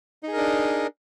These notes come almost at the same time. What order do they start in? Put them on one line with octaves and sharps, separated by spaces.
D#4 G#4 A#4 D4